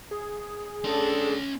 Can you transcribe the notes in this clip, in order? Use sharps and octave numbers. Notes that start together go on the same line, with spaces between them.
G#4
C#4 D4 A4 C6